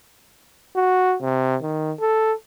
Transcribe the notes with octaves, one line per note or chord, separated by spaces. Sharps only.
F#4
C3
D#3
A4